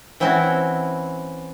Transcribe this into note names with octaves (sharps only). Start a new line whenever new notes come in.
E3 C4 C#4 E4 F#4